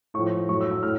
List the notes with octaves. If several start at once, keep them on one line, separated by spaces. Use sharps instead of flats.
A2 F3 C#6
A2 F#3 C#6
E6
E6
A2 F6